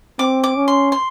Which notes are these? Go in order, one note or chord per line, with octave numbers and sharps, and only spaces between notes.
C4 D6
D6
C#4
C6
C6